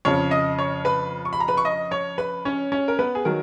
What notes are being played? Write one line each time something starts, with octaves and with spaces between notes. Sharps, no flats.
F2 C#3 F3 C#5 C#6
D#5 D#6
C#5 C#6
B4 B5
C#6
B5
A#5
B4 B5
C#6
D#5 D#6
C#5 C#6
B4 B5
C#4 C#5
C#4 C#5
A#4
B3 B4
G#4
D#3 F#3 A#4